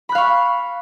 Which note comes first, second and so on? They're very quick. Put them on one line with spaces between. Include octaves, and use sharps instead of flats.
B5 F#6 F5 C#6